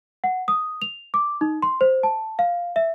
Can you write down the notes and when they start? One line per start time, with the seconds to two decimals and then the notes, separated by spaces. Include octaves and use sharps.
0.24 F#5
0.48 D#6
0.82 F7
1.14 D6
1.41 D#4
1.62 C6
1.81 C5
2.03 A5
2.39 F5
2.76 E5